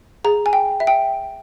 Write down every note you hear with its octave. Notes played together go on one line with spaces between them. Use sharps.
G#4 A#5
G#5
G5
E5
G5